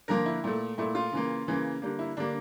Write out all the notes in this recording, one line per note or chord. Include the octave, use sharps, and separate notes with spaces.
D3 F3 A#3 A#4
E4
A#2 A3
A#2 A3 E4
F4
C#3 E3 A#3
C#3 E3 A#3
D3 G3 A#3
E4
D3 G3 A#3 D4